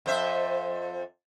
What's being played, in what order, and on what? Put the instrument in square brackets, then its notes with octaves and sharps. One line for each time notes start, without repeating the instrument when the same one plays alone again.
[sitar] F2 C5 E5